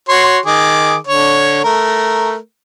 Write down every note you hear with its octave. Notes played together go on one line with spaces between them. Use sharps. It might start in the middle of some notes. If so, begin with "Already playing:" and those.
F#4 C#5 C6
D#3 G#4 D6
D3 C#5
A3 A#4